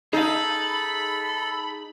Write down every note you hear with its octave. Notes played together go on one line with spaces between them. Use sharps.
D#4 G#4 A4 F5 A#5 B5